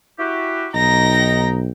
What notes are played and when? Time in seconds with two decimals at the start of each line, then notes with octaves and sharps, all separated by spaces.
0.19 E4 F#4 G4
0.75 B1 D#4 G5 A#5 A#6